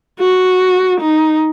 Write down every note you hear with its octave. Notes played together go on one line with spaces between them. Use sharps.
F#4
D#4